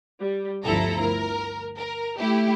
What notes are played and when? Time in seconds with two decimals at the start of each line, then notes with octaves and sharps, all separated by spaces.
0.21 G3
0.64 G1 D2 F3 E4 A4 A#5
1.00 A#4
1.77 A#4
2.19 A3 E4 G4